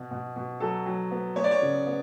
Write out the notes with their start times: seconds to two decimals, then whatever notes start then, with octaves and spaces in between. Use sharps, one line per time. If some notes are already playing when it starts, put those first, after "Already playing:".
Already playing: B2
0.11 B2
0.36 B2
0.60 F#3 A4
0.86 F#3
1.11 B3
1.36 B3 C#5
1.44 D5
1.51 C#5
1.62 C#3
1.87 B3